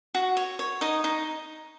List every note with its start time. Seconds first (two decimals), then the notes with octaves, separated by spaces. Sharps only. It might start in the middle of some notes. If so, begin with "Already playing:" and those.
0.15 F#4
0.37 C#5
0.59 C#5
0.81 D#4 D#5
1.04 D#4